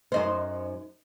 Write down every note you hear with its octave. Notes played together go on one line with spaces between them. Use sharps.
F#2 D#4 C5